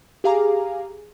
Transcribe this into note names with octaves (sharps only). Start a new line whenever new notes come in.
G4 G#4 F5 G#5 A#5 D6